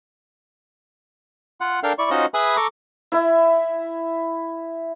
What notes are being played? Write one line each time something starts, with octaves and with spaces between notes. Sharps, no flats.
F4 F#5
D4 A4 A#4 F5 G5
E4 D5 C#6
C#4 D#4 F4 F#4 C5 D#5
G#4 B4 E5 G#5 B5 D#6
A4 A#5 C#6 D6
E4 E5